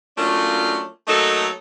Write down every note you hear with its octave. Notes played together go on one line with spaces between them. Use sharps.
F#3 A3 A#3 C#4 D4 F4
F#3 A3 A#3 D#4 A4